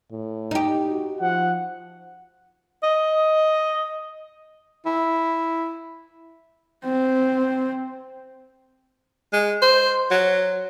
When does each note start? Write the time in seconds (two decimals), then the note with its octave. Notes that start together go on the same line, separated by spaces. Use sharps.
0.12 A2
0.51 D#4 G4
0.90 F#4
1.21 F3 F#5
2.83 D#5
4.86 E4
6.84 C4
9.33 G#3
9.62 C5
10.11 F#3